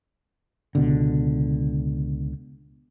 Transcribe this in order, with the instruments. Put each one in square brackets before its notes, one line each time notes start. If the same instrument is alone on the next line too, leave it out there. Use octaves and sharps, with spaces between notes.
[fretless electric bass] C#2 B2 D3